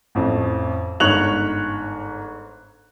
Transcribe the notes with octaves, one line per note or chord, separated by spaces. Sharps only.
A1 F2
G1 G#2 C#5 F#6 F7 F#7